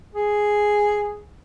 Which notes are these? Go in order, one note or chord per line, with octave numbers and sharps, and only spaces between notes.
G#4